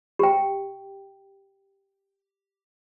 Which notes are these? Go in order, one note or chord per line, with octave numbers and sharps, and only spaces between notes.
G4 G5